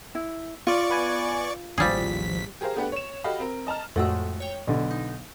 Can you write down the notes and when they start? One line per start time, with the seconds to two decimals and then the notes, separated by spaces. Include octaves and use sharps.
0.15 E4
0.67 F4 D5 C#6
0.90 B3 B4 G#5
1.78 A1 D#2 F3 G3 G#4 B6
2.61 G4 G#4 A#4 C5 F5
2.76 A3 B3 D4 G4 B4 F#5
2.92 C#5 E7
3.24 F#4 G4 A4 D#5 F5 B5
3.39 C4 A#4
3.67 D#5 A5 A#5 F6
3.96 F2 A2 G#3 A3 F#4 E6
4.40 C#5 G5
4.67 B1 D3
4.91 D#4